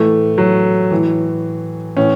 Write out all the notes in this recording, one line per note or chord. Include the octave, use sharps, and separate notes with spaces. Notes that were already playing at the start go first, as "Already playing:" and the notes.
Already playing: A2 E3 A3
F#3
A2 E3
A2 E3 C#4